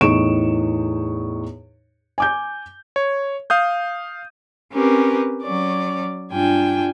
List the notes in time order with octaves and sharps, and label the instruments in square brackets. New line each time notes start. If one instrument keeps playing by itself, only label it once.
[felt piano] E2 A2 D#4 C#6 D7 E7
G#5 D6 G6
[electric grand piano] C#5
F5 D#6 G6
[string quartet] C4 C#4 G4 A#4 B4
F#3 C#4 D5
G2 D4 F4 G5 G#5